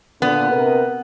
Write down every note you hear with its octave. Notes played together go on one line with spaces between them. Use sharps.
A#2 D3 B3
C3 A#4 B4